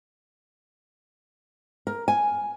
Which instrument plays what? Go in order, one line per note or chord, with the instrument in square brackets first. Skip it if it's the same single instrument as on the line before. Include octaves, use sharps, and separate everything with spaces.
[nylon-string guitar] A#4
G#5